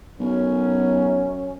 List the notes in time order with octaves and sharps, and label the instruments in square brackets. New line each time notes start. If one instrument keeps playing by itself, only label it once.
[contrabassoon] B1 [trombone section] F#2 C#4